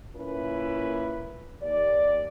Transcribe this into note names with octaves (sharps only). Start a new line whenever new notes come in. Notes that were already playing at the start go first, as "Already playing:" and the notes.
A#2 A#3 C#4 E4 B4
D#2 D5